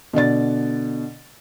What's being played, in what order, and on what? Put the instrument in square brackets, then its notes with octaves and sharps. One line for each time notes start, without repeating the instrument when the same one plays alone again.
[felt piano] B2 D3 D5 A6